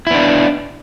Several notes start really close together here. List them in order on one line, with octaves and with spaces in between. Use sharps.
E4 B3 D4